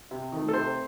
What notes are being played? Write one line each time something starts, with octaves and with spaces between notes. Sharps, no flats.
C3
D#3 A3
A4
C3 C5